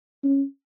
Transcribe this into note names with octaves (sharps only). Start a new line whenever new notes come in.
C#4